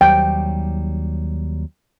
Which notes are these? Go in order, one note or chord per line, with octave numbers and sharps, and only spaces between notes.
D#2 F#3 G3 G5